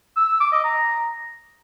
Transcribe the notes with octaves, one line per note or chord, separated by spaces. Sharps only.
E6
E6
D6
D#5
A#5